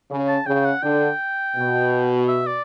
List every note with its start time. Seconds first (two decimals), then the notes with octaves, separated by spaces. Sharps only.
0.10 C#3
0.29 A5
0.46 C#3 G5
0.65 F#5
0.83 D3 G5
1.56 B2
2.28 E5
2.47 D5